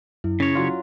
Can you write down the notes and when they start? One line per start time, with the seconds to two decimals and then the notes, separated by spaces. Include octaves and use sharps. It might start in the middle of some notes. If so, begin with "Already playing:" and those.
0.24 F#2 E4
0.40 C#3 C#4 C#5
0.55 F#3 F4